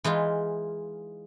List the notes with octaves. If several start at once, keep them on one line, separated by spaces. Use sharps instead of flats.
E3 G#3 D#4 F4